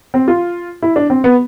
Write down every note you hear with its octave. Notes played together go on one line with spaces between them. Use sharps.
C4
F4
E4
D4
C4
B3